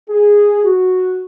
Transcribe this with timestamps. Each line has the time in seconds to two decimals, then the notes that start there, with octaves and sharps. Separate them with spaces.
0.10 G#4
0.63 F#4